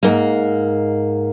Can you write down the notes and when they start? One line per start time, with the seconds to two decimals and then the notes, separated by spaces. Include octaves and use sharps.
0.03 G#2 A#3